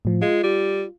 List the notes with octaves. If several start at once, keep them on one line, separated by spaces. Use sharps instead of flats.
A2 F3
G#3 F4
G3